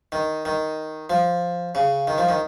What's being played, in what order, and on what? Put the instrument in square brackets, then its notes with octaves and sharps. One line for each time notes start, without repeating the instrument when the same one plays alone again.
[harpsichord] D#3
D#3
F3
C#3
D#3
F3
D#3